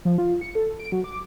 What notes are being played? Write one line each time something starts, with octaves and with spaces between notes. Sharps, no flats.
F3
F4
C#7
A4
D7
F#3
D6